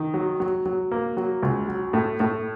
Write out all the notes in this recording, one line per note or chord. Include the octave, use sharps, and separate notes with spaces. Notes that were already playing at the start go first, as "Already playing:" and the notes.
Already playing: D#3
F#3
F#3
F#3
A#3
F#3
C#2
F#3
A2
A2